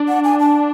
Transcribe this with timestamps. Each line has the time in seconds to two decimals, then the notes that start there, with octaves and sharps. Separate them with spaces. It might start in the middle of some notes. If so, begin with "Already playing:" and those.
Already playing: D4
0.08 F#5
0.24 G#5
0.39 A5